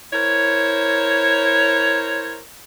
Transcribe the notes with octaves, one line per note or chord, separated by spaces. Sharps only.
E4 A#4 C5 C#5